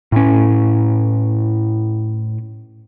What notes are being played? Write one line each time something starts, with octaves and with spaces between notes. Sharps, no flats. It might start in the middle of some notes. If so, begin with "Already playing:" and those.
A2 C#4